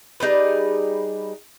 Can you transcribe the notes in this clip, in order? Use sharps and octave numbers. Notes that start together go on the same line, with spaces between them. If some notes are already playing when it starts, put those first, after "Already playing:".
G3 D#4 G#4 B4